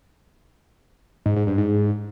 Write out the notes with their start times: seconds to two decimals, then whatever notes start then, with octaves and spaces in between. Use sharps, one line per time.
1.26 G#2
1.36 G#2
1.47 G2
1.58 G#2